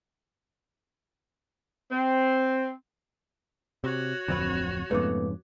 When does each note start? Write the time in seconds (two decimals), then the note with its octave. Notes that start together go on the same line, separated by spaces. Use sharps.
1.91 C4
3.84 C3 F#4 C#5
4.28 D1 F2 D3 C4 B4
4.91 F2 G#2 C#3 A3 B3 B4 D6